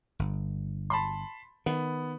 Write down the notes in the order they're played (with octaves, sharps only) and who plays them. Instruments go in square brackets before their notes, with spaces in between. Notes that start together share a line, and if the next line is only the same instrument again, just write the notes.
[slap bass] G1
[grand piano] A5 B5 C6
[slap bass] D#3 [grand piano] B3